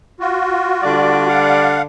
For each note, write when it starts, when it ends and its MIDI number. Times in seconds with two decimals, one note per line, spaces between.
0.20 1.27 65
0.20 1.27 66
0.83 1.86 50
0.83 1.86 55
0.83 1.86 74
1.28 1.82 77
1.28 1.82 78